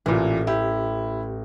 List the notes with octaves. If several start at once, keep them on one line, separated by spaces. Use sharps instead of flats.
A1 A#2 E3
E4 G4